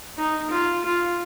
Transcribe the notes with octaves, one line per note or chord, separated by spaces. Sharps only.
D#4
F4
F4